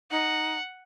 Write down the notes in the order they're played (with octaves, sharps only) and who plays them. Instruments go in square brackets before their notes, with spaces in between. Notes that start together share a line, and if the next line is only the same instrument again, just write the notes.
[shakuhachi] D#4 [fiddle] F#5